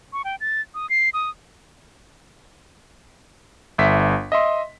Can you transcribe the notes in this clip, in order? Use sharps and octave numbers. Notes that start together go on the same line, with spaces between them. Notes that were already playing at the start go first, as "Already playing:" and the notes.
C#6
G5
A6
D#6
C7
D#6
G1 E5 B6
D#5 E5 C6